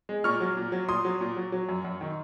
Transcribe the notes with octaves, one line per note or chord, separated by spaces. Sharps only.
G#3
A#2 C#6 F6
F#3
A#2
F#3
A#2 C6 D#6
F#3
A#2
F#3
F#3
F#2
F#2
D#3